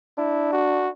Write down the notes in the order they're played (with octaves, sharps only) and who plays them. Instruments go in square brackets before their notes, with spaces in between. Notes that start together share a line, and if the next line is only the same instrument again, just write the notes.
[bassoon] D4 [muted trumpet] E4
[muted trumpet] F#4